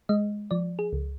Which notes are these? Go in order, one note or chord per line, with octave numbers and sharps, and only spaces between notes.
G#3 D#5
F3 D5
G#4
C#2